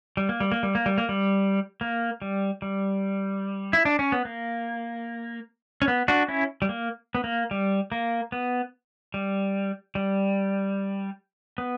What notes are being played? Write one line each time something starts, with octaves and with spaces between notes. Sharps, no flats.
G3
A#3
G3
A#3
G3
A#3
G3
A#3
G3
A#3
G3
G3
E4
D4
C#4
B3
A#3
C#4
B3
D4 F#4
C#4 E4
G3
A#3
B3
A#3
G3
A#3
B3
G3
G3
B3